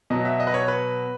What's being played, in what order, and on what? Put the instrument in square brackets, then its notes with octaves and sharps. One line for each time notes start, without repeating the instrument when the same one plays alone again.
[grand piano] B2 F#3 D#5
E5
D#5
B4
C#5
B4